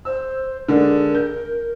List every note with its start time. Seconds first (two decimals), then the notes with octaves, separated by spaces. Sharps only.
0.05 C5 E6
0.68 D3 G#3 D4 A#4
1.15 G6